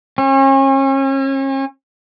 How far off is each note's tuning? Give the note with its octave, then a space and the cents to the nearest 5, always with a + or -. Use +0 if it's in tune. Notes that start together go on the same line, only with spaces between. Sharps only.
C#4 -40